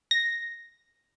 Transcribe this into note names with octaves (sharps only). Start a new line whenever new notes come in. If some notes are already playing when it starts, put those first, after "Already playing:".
A#6